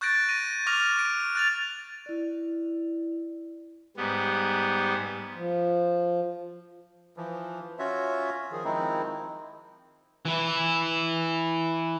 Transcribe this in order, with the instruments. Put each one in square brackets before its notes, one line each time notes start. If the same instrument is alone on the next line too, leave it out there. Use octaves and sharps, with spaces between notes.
[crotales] C#6 F#6 G6 A6 A#6 D7
A#6 D#7
C#6 D6 F6 A#6 D#7 F7
D7
F#6 A6 F7
[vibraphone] E4 D5
[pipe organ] G#2 G3 B3
[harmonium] F3
[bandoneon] E3 F3
C#4 F4 F#4 C#5 E5
D#3 F3 G#4
D#3 F3 G#3 C4 D#4 E4
[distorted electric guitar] E3 E4